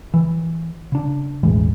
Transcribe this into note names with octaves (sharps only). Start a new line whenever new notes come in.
E3
C#3 D4
E1 A1 E3 G#3